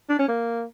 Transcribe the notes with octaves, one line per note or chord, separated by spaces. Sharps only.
D4
C#4
A#3